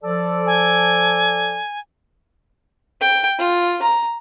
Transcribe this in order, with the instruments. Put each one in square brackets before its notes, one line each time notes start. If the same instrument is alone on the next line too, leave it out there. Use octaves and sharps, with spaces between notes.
[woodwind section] F3 A4 D5
[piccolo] G#5
[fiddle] G5
F4
A#5